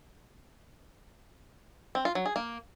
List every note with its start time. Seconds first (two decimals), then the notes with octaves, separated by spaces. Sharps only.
1.95 C4
2.05 F4
2.15 F#3
2.26 G#4
2.36 A#3